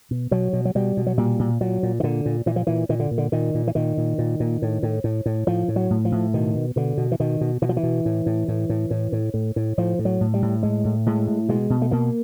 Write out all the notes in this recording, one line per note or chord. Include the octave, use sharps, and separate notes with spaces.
B2
B2 F#3
B2
F#3
B2 G3
B2
F#3
A#2 G3
A#2
A#2 F#3
A#2
D#3
A#2 D3
A#2
A#2 E3
F3
A#2 E3
A#2 D#3
D3
A#2
D3
A#2 D#3
A#2
E3
A#2 D#3
A#2
A#2
A#2
A2
A2
A2
A2
A2 F3
A2
F#3
A2
F3
A2
B2 D#3
B2
B2 D3
B2
E3
B2 D#3
B2
B2 E3
F3
E3
B2
A2
A2
A2
A2
A2
A2
A2
A2
A2 F3
A2
F#3
A2
G3
A2
A2 G#3
A2
A2 G#3
A2
B2 G#3
B2
A3
B2 A#3